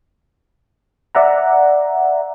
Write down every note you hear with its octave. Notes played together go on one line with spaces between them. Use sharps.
D5 E5 F#5 A#5